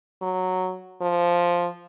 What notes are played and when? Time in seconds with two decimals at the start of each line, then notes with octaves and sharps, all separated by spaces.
0.22 F#3
1.01 F3